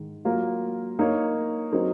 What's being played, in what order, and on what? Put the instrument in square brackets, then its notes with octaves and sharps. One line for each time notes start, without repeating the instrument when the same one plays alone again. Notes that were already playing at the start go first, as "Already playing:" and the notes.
Already playing: [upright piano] G#2 D#3 G#3
F#3 A#3 F4 A#4
A#3 D#4 A#4 C#5
F#3 C4 D#4 A#4